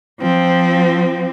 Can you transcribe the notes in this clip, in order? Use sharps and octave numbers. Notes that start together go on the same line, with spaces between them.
F3 C4